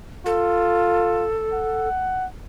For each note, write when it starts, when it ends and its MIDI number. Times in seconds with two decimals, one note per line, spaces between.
0.26 1.26 65
0.26 1.89 69
1.53 2.26 78